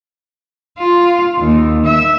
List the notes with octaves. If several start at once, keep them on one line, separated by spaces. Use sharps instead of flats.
F4
D#2
E5